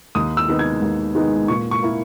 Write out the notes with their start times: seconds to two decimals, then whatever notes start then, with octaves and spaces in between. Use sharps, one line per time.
0.15 D#2 D#6
0.37 E6
0.48 D#3 G#3 B3 D#4
0.59 G#6
0.82 D#2
1.15 D#3 G#3 B3 D#4
1.48 A#2 C#6
1.71 C#6
1.82 A#3 E4